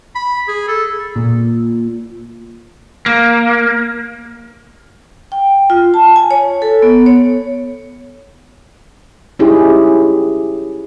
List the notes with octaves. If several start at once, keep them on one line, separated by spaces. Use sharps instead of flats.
B5
G#4
A4
A#2
A#3
G5
F4
A5
G#5
C#5
A4
B3
C#5
C#4 D#4 E4 G4 G#4